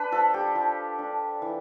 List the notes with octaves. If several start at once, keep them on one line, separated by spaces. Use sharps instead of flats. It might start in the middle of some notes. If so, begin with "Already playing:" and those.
Already playing: D4 B4
F3 A4
G4
F3
D4
E3